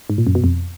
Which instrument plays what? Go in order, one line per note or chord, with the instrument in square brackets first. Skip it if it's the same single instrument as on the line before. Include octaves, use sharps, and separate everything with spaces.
[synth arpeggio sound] G#2
A#2
F#2
B2
F2